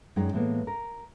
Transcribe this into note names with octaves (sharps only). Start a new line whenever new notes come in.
F#2 G#3 D#4 D5 G5
A2 E3 G#3 A#3 B3
A#4